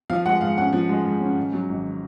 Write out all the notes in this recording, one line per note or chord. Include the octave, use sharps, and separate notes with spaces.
F3 F5
G#3 F#5
G#2 F5
C#4 F#5
F3
G#3
G#2
C#4
G#2
F#3
G#1